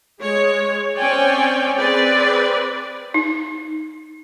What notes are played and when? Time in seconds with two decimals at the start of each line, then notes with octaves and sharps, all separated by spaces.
0.21 G#3 C#5
0.97 C4 C#4 C#5 D5 G5 G#5
1.78 C4 G#4 B4 D5
3.14 D#4